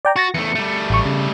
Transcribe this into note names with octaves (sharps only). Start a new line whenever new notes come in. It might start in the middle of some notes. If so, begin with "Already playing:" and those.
D5 G5 A#5
F#4 C#6 A6 A#6
E2 A3 C#7
G3 A3
A1 C#6
C#3